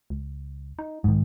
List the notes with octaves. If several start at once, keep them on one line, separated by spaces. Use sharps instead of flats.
C#2
D#4
B1 G#2 D#3